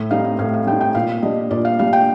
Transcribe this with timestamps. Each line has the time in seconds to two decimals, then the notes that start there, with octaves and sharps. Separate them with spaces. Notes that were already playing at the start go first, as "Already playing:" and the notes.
Already playing: A2
0.11 G3 C4 D#4 F5
0.39 A2 F5
0.54 F5
0.67 G3 C4 D#4 G5
0.81 G5
0.95 A#2 F5
1.22 G3 D4 D#5
1.51 A#2 D5
1.65 F5
1.79 G3 D4 F5
1.93 G5